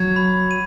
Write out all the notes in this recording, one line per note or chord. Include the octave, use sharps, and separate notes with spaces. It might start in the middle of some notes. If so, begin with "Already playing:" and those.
Already playing: F#3 G#6
B5
D#7